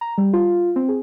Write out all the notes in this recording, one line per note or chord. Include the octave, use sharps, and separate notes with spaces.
A#5
G3
F4
C4
G#4